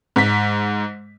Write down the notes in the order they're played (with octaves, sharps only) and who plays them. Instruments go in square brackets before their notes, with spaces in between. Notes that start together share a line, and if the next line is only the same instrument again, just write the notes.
[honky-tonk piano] G#2 B6